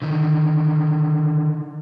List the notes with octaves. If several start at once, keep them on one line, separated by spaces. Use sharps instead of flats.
D3 D#3